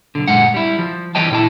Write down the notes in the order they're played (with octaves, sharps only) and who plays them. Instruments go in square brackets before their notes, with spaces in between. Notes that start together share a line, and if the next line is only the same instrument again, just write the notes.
[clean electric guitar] B1 G#2 D3
F#2 A#2 G#3 F#5
G3 E4
F3
E3 G3 C#5 D#5 G5 A5
A#2 E4 A5